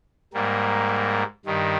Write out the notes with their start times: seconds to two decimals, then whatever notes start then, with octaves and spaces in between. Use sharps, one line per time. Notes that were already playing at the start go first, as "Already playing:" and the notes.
0.33 G#2 G3 A#3
1.45 G2 D#3 G3